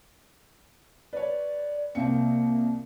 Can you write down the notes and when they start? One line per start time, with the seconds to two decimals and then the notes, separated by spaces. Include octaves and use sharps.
1.13 B4 C#5 D5
1.95 C2 A#3 C4 C#7